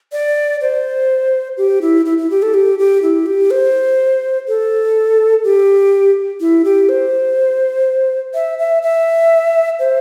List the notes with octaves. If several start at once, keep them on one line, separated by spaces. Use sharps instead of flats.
D5
C5
G4
E4
E4
E4
G4
A4
G4
G4
E4
G4
C5
A4
G4
E4
G4
C5
E5
E5
E5
C5